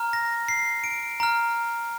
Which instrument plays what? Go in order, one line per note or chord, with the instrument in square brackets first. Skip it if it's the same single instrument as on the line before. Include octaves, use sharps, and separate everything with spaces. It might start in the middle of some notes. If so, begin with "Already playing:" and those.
Already playing: [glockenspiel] A#5 F6
A#6
C7
D7
A#5 F6